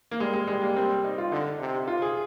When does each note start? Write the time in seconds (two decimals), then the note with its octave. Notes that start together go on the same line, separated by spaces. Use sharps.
0.11 A#3
0.20 G3 G#3
0.33 G#3
0.47 G3 G#3
0.62 A#3
0.76 C4
1.04 D#4
1.18 F4
1.32 D3 D#4
1.60 C3
1.87 F4
2.02 G#4